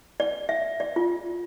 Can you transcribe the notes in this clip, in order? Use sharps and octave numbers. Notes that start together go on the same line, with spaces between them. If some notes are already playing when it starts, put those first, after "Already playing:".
D5
E5
D5
F4